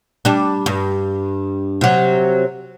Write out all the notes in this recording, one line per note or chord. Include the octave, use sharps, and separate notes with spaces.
G3 D4
G2
C3 F#3